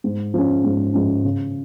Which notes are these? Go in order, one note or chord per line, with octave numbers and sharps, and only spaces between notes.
G#2
F3 G#3 C#4
G#2
F3 G#3 C#4
C#3